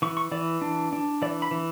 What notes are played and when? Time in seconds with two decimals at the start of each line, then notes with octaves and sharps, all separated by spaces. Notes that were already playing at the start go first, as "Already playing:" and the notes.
0.02 E3 C#6
0.17 C#6
0.32 E3 D5
0.62 D4
0.93 D4
1.22 E3 D5
1.42 B5
1.51 E3